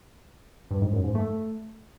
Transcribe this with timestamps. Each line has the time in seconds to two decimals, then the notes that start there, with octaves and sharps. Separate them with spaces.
0.71 G2
0.82 G#2
0.93 F#2
1.04 G#2
1.15 A3